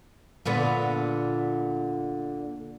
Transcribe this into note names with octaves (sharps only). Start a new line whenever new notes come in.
A#2 D3 B3